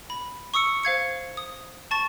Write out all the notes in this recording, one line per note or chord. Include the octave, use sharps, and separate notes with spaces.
B5
C#6 D#6 E6 C#7
C5 F5 G#6 C#7
D#6
A5 C#6 A6 E7